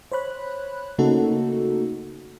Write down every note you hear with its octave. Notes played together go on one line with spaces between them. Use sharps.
C5 C#5 B5 F#6
C#3 A3 A#3 D#4 F#4 A4